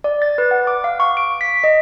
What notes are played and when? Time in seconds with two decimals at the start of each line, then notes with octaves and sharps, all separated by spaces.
0.04 D5
0.22 A6
0.38 B4
0.51 F#5
0.67 D6
0.84 F5
1.00 C#6
1.17 D7
1.41 B6
1.64 D#5